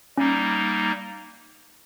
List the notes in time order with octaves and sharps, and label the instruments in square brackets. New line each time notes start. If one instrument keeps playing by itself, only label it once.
[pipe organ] G3 A#3 D#4 [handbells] C#4